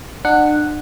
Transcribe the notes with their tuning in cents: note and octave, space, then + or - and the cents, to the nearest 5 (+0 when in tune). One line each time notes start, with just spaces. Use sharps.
D4 +40 F#5 +0